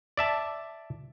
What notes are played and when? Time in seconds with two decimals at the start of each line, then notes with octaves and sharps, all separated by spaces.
0.17 D5 E5 A5